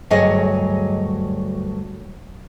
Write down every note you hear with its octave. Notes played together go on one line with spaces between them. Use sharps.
D2 G2 F#3 G#4 C#5 D#5